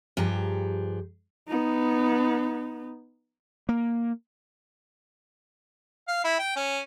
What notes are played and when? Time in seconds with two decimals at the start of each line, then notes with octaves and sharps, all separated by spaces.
0.17 G2 F3 G4 G#4 A#5
1.49 B3 D#4
3.69 A#3
6.08 F5
6.24 E4
6.39 G5
6.56 C#4